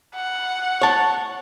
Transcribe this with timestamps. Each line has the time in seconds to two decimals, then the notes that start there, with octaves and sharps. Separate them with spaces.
0.15 F#5
0.82 C#5 A5